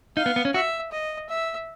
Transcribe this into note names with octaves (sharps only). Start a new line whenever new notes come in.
D#4 F5
B3
B3
C#4
F#4 E5
D#5
E5